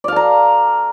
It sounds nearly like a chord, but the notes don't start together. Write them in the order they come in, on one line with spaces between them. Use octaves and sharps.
D5 F5 A4 A#5